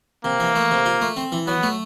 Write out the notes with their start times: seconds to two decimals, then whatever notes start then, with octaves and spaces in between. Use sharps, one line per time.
0.24 C3 A#3
0.40 E3
0.55 A3
0.71 C3
0.86 F4
1.01 A3
1.17 C4
1.32 E3
1.47 F#3 B3
1.63 A3